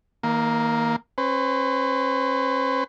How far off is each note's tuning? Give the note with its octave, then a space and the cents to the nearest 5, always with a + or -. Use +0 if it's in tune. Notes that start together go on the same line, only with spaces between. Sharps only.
D#3 +40 A#3 +0
C#4 -40 B4 +40